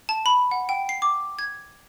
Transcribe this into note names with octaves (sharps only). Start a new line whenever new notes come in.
A5
B5
F#5
G5
C7
D6
G#6